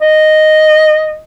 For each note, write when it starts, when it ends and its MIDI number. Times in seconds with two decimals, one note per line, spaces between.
0.01 1.20 75